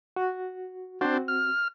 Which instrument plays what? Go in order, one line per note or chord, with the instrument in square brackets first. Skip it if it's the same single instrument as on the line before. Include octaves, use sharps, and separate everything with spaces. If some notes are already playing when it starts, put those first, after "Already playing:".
[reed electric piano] F#4
[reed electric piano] C4 F#4 [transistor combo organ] D4 C5
[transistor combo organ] F6